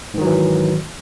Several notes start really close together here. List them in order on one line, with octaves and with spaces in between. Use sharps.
G#2 D#3 F#3 E3